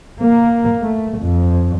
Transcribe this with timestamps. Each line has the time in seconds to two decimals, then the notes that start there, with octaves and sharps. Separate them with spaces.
0.21 A#3
0.83 A3
1.19 F2